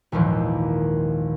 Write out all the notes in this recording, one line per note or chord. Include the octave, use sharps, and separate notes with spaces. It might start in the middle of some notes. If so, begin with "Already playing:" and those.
G#1 D#2 A#2 E3 F3